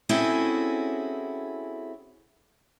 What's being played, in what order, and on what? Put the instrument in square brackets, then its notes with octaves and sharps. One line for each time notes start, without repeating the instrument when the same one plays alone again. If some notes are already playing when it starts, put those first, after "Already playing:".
[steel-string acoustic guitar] C4 C#4 E4 F#4 G#4 A4